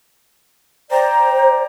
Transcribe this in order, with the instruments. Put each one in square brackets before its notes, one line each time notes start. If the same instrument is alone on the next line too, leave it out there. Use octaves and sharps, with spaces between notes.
[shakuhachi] C5 [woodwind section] D5 G5 A#5